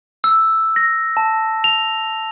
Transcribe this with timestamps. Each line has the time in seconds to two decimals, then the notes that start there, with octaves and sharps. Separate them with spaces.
0.24 E6
0.76 A#6
1.17 A5
1.64 F7